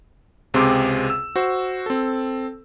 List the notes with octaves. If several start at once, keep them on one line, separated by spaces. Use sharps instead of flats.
C#2 C3 C4 G#4 C6 D6
E6
F#4 C5
C4 A4